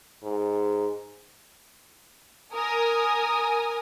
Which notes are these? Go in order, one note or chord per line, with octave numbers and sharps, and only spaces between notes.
G#2
A#4 G#5 D#6